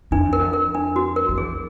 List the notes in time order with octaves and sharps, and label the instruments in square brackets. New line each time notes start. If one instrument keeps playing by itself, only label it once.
[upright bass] F2 [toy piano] D4
[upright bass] E2
[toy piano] A#4
[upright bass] F2
[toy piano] A#4
D4
F#4
A#4
[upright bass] F2
[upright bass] E2 [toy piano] G#4